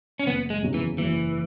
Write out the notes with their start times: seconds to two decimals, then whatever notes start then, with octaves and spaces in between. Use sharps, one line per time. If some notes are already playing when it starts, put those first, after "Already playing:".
0.19 C#4
0.27 F#1 B3
0.50 G#3
0.62 E2 C#3 F#3
0.74 E3
0.98 F#1 E3